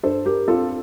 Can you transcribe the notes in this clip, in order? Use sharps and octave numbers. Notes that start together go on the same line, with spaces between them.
G2 A4 C5
G4 A#4
C4 F4 A4